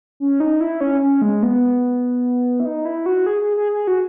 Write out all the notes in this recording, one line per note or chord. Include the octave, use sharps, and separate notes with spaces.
C#4
D#4
E4
C#4
C#4
G#3
B3
E4
D#4
E4
F#4
G#4
G#4
G#4
G#4
F#4